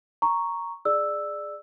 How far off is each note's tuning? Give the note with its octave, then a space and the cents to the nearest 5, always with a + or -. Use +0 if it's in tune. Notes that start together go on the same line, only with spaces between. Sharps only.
A#5 +0 C#6 +0
G#4 +10 D5 +15 E6 +0